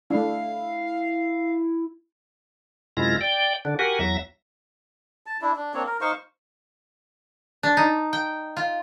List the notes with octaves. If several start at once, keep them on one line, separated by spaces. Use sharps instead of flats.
A3 D4 E4 F5
F#2 C3 G#3 E4 F4 A#6
D5 G5
D3 D4
F#4 G4 A#4 F#5 G#5
E2 F#3 E5 A#6
A5
D4 E4
D4
A#3 C4 D4 C#5
A#4
D#4 C5 F5 C#6
D4
D#4
G5
F4